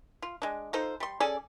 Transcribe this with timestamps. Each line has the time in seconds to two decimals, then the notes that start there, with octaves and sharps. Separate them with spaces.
0.22 F4
0.42 G#3 D4
0.73 D#4 F4 A4 C5
1.00 G3 C6
1.20 C#4 G#4 A4 D5